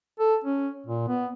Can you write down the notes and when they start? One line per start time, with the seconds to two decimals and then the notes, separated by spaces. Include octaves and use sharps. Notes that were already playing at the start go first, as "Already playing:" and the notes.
0.19 A4
0.44 C#4
0.86 A#2
1.07 B3